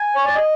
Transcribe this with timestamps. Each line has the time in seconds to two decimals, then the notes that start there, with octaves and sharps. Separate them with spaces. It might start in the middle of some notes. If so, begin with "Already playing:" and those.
Already playing: G#5
0.16 C#5
0.25 D5
0.35 D#5